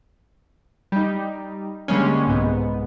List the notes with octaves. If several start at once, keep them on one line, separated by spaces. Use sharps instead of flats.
G3 D#4
D3 G3 G#3 A#3 C#4
C2 G#2 B3